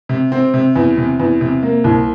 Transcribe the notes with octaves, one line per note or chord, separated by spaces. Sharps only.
C3
C4
C3
E2
C3
E2
C3
A#3
C2